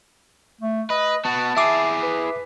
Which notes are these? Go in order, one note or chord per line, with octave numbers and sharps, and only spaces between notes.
A3
B4 D#5
B3 F#4 A5
E4 G#4 E5 D6 C7
B4